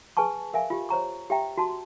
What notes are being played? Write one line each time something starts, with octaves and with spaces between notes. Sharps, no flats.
G#4 B4 G#5 A5 C#6
A#4 E5 F5 G#5
F4 G4
C5 C#5 A#5 C#6
G4 E5 G5 A#5
F#4 A5 C6